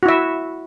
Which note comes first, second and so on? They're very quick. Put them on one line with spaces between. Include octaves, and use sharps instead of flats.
F#4 E4 E5